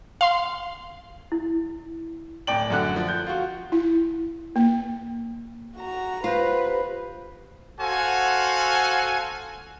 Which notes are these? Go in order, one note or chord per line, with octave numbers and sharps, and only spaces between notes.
F5 C6
E4
D1 D5 G5 F#7
F#2 D3 F#6
F3
G6
F4 F#4
E4
A#3
F#4 A#5
B3 F4 G4 B4 C5
F#4 A4 C5 F5 F#5 G#5